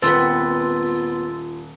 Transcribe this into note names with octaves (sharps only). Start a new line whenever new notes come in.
D#1 B3 C4 F4 B4 C6 E6 A6